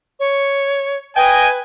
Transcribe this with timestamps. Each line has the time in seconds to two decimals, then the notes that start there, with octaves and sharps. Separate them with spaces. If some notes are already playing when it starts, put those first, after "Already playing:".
0.19 C#5
1.16 B4 D#5 G5 G#5